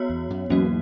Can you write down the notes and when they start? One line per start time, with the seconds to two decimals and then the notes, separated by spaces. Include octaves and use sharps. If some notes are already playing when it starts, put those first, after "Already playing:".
Already playing: B3 F#4 C#5
0.09 E2
0.30 F#2
0.50 E2 G#2 F#3 A#3 C#4 F#4